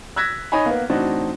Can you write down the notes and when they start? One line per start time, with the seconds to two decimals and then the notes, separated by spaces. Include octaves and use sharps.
0.16 E6 F#6 G#6 A#6 B6
0.52 D#4 C#5 D#5 G#5 B5
0.66 A#3 B3
0.90 A2 E3 C4 D4 D#4 F#4